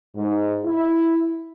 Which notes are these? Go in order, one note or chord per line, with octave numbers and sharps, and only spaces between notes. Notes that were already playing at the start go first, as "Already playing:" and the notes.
G#2
E4